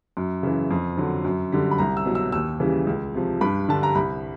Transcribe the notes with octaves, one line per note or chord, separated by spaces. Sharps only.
F#2
C#3 E3
F2
D3 F#3
F#2
D3 G3
B5
C2 A#5
E6
B2 F#3
E6
D#2 E6
C#3 E3 G3
C#2
C3 F3
G2 B5
D3 G3 A5
A#5
C2 B5